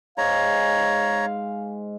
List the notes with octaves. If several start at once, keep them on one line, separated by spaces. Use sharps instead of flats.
G#2 G#3 C#5 F5 A#5